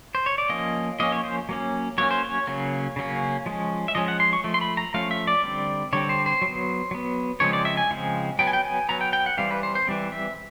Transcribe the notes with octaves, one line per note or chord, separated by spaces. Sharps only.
C5
C#5
D5
F3 A#3 C#4 D#5
F3 A#3 C#4 D#5
C#5
C5
F#3 A#3 C#4
F#3 A#3 C#4 C#5
C5
C#5
C#3 F#3 A#3 C#4
C#3 F#3 A#3 C#4
F3 G#3 C#4
E5
F3 G#3 C#4 D#5
F#5
C6
C#6
F3 A3
C6
B5
A#5
F3 A3 C#4 F5
E5
D5
D3 G3 C4
D3 G3 C4 C#5
C5
C5
F#3
B3
F#3 B3
C#3 F3 G#3 C4 C#5
D5
E5
G#5
C#3 F3 G#3 C4
F#3 B3 G5
G#5
G5
G#5
F#3 B3 A#5
G5
G5
F#5
E3 G3 C4 F5
B4
C5
C5
E3 G3 C4
E5